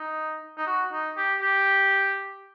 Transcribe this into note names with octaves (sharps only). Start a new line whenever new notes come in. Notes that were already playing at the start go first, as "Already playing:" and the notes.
Already playing: D#4
D#4
F#4
D#4
G4
G4